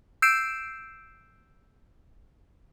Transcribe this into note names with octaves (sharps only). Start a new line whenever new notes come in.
E6 G6 C7 D7 E7